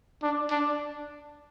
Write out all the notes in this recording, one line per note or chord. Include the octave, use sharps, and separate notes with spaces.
D4
D4